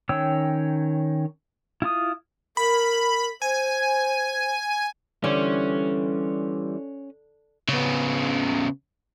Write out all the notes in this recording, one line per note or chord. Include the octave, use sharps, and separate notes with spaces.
D#3 C#4 C#5 G5 E6
E4 F4 D#6
A#4 B5
C5 G#5
D3 E3 G3 C#4 C5
C#3 B3